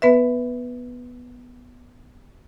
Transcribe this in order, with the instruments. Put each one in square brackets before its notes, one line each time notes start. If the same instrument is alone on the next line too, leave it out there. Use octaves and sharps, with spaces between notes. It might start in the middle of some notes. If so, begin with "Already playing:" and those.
[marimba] B3 B4 E5